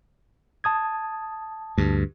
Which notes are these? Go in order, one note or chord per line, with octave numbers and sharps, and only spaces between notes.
A5 D#6 G#6
D2 G2